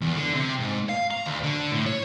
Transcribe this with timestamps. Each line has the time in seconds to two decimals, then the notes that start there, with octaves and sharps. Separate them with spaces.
0.01 E2
0.16 D3
0.33 C3
0.60 G#2
0.89 F5
1.11 A#5
1.26 D2
1.44 D3
1.72 A2
1.86 C#5